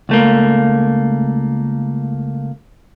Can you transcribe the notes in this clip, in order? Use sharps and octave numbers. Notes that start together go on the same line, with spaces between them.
C#2 A3 A#3